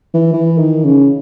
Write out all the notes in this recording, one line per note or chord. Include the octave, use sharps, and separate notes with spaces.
E3
E3
D#3
C#3